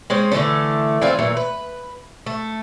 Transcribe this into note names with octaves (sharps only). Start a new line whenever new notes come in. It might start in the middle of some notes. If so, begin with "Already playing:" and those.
G#3 C4 C#4
D3 E3 A3 C#4
E3 C4 F4 D5
A#2 E3 F#3
B4
A3